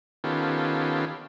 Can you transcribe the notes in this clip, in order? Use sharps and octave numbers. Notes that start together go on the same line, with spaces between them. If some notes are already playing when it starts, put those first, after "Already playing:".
D#3 B3 C#4 F4 G4 A4